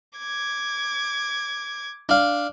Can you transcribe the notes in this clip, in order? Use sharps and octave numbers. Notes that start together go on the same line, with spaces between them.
D6 G#6
D4 F5